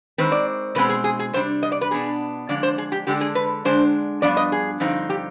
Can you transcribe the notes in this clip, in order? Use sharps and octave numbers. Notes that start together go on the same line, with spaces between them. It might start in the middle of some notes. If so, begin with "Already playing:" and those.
D#3 G#3 C4 B4
D5
B2 G#3 C4 B4
G#4
G#4
G#4
C3 G3 D4 C5
D#5
D5
B4
B2 B3 D4 G#4
F2 D3 G#3 D4 D5
C5
G#4
G4
D3 G#3 D4 G4
G#4
B4
D3 G#3 D4 C5
G2 F3 B3 D4 D5
D#5
G#4
G2 D3 F3 C4 D#4
G4